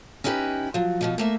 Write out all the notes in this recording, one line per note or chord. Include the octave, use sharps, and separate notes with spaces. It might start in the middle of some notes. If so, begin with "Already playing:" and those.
C#4 D#4 E4 G4 B4
F3 F#3
B2 F3 D#4
A3 A#3 E5